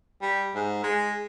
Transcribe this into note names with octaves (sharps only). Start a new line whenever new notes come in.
G3
G#2
G#3